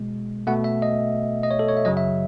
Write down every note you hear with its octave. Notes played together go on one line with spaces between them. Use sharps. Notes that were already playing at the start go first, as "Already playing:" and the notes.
Already playing: B2 G#3
B2 A3 F#5
E5
D#5
D#5
C#5
A4
C#5
E5
F#2 C#3 F#3 D#5
E5